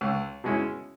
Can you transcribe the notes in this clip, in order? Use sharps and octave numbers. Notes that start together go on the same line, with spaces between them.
C#2
B2 G#3 C#4 E4